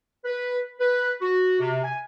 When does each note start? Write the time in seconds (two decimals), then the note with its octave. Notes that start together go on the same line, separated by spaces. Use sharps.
0.25 B4
0.80 B4
1.21 F#4
1.60 C3
1.83 G#5